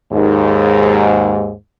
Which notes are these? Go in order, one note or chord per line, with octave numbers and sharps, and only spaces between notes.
D#2 G#2